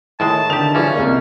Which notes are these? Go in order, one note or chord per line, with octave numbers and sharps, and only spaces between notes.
A2 D#3 G#3 A5
D3 D#3 G4 F7
E3 F3 G3 C#4 G#4
C2 G#3 A#3